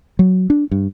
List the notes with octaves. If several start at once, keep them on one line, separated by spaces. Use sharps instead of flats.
F#3
D4
G2